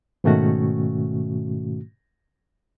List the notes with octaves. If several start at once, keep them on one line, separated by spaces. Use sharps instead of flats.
G#2 B2 D#3 A3 C#4 F#4